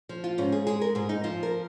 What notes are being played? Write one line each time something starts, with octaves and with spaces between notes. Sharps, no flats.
F3
F4
G#2 C#4
G#4
G#3 G#4
A#4
G#2 G#4
D#4
F3 F4
A#4